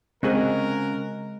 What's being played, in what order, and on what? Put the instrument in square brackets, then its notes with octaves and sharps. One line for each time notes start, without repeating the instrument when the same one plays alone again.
[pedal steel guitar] C#3 F#4 G#5 [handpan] G#3 [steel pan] C4 G#4 [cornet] A#4